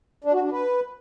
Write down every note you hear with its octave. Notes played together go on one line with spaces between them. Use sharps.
D4
F#4
D4
B4